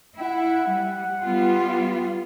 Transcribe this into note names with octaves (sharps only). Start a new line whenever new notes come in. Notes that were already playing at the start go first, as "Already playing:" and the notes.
E4 F#5
G3
G3 B3 F4